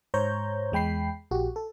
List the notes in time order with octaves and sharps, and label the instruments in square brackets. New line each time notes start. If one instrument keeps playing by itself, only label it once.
[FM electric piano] G#2 C5 C#5 A#5 G6
E2 G#3 G5 B5 C7
A#1 F#4 G4
A4